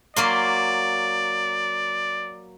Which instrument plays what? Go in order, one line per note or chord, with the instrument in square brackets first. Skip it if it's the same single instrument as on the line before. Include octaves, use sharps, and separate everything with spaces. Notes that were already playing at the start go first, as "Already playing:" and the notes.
[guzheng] F#3 A#3 C6 [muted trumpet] D5